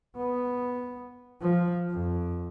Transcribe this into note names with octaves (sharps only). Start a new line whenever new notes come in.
B3
F3
F2